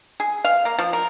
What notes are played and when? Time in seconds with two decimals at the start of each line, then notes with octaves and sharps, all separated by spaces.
0.20 G#4
0.45 F5
0.65 A#3
0.78 F3
0.93 A#4